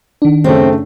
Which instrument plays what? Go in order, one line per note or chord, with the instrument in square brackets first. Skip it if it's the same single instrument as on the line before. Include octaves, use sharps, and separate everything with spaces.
[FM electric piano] D#3 D4
[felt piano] F#2 C#3 A3 [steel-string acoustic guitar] C4